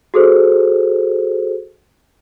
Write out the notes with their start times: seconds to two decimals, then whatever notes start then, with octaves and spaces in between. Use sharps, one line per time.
0.14 F#4 G#4 A4 C5